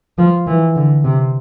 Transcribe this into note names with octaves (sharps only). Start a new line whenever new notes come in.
F3
E3
D3
C3